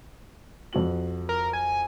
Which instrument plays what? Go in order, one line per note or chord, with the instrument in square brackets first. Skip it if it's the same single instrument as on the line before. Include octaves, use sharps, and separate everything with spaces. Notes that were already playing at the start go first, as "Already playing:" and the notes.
[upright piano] F2 F#4 F#7
[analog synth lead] A#4
G#5